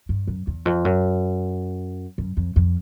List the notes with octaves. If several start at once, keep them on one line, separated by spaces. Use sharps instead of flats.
G2
F#2
E2
F2
F#2
F#2
F2
F2